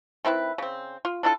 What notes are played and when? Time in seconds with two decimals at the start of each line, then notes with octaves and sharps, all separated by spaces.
0.25 D#3 C4 E4 B4
0.58 C#3 C4
1.05 F4
1.23 D4 E4 F4 A4